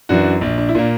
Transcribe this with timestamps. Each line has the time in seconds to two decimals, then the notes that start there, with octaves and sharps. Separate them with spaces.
0.09 F#2 E3 D4 F#4
0.41 A#1 D4
0.58 D4
0.69 E4
0.75 A#2 A#3 D4